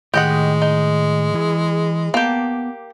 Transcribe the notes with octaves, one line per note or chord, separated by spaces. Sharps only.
A2 D#3 G#3 G4 D#5 F#5
D#4
E3 E4 G#4
A#3 B3 G4 A5